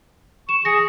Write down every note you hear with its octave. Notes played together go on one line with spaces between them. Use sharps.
C#6 E7
G#4 A#6 C#7